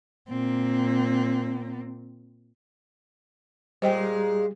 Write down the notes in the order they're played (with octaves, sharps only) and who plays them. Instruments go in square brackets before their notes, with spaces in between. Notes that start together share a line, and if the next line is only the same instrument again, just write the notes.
[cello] A#2 C4
[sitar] A#2 G#3 [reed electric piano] G3 G4 [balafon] C5 D#5 G5